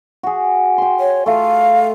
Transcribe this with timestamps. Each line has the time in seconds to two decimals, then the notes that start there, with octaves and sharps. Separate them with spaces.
0.23 F#4 G#4
0.78 G5 C6
1.00 C#5
1.26 A3 F4 F5